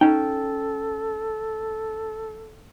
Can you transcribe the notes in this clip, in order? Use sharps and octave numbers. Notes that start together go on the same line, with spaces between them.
C#4 D#4 A4 G5